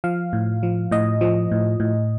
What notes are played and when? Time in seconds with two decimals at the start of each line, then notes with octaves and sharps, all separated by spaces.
0.04 F3 F5
0.33 A2
0.63 F3
0.91 A2 D#5
1.21 F3
1.51 A2
1.80 A2